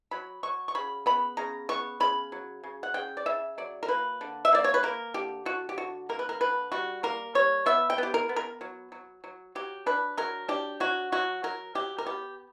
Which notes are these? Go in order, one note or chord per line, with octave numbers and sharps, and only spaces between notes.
F#3 B5
F#3 C#6
C#6
C#3 B5
B3 B5
C#3 A#5
B3 C#6
C#3 B5
F#3
C#3
F#5
C#3 G5
D5
C#3 E5
F#3 D5
A#4
A#3 B4
D3
E5
A#3 D5
C#5
B4
A#3 A#4
D3 G4
D3 F#4
G4
D3 F#4
A#3 A#4
B4
A#4
D3 B4
G3 F#4
A#3 A#4
G3 C#5
B3 E5
G5
B3 G4
A#4
B3
A#4
F#3
F#3
F#3
F#3 G4
D4 B4
F#3 A#4
D4 G4
F#3 F#4
F#3 F#4
F#3 A#4
F#3 G4
A#4
B3 G4